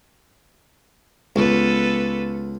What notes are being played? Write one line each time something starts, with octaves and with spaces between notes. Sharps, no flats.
C#2 B3 A4 B4